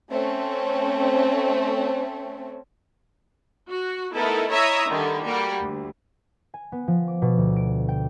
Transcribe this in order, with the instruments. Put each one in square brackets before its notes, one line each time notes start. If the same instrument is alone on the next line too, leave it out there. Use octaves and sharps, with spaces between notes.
[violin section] A3 C4 C#4
[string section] F#4
A3 B3 D#4 E4 A4 A#4
E4 C#5 D#5 E5 A#5 D#6
D3 D#3 G3
G3 A#3 F#4
D2
[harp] G#5
B3
F3
D6
B2
D2
D7
G5